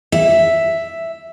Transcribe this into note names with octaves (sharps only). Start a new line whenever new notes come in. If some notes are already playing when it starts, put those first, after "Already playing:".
E5